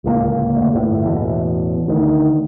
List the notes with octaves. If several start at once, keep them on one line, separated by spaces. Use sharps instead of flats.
D1 C#2 D3 A#3
E1 D2
G1 A2
A1 E2 B2
D2 D#3